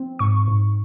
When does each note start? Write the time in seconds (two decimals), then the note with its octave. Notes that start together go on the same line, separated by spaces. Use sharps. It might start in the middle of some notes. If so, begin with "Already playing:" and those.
Already playing: F3 C4
0.19 G#2 C#6
0.48 G#2